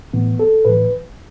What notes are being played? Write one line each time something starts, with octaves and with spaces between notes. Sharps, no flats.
A2 E3 B3
A4
A2 E3 B4